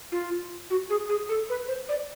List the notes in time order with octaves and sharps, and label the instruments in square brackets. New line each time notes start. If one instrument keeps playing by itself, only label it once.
[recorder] F4
F#4
G#4
G#4
A4
B4
C5
D5